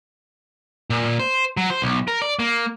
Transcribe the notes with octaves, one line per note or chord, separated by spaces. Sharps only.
A#2
C5
F#3
C5
B1
A#4
D5
A#3